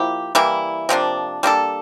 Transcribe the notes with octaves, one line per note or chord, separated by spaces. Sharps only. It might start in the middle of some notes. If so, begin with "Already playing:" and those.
Already playing: F3 A#3 E4 G4
E3 G3 A#3 E4
C3 F3 A#3 D4
G3 A#3 D4 A4